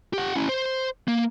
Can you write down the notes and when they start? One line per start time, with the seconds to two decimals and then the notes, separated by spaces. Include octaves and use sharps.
0.13 G4 F#5
0.35 C#4 E4
0.49 C5
1.08 A#3